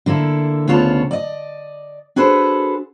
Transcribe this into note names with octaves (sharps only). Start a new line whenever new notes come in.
D3 A#3 E4 A4
D2 C#3 B3 F4 C#5 A5
D5 D#5
D4 F#4 G#4 A4 B4 C5